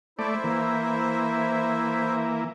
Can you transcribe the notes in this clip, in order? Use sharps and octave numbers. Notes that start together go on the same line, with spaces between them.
A3 E4 C5 D5 E5
E3 A#3
E5